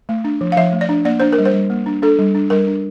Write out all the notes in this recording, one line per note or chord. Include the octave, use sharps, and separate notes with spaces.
A3
D4
F3
F5
F3 E5
A3
D5
D4
A#3 D5
D4 C5
A#4
G3
C5
G3
A#3
D4
D4 A4
G3
D4
G3 A#4
D4